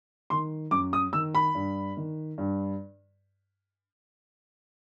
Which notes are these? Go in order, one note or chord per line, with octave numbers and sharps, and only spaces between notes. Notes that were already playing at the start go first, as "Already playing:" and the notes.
D#3 C6
F#2 D6
D#6
D#3 E6
B5
G2
D#3
G2